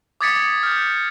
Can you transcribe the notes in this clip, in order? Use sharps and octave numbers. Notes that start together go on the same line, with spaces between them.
D6 D#6 G#6 A6 B6 C#7
F6 G6